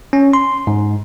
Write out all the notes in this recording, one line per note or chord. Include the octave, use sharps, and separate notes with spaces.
C#4
C6
G#2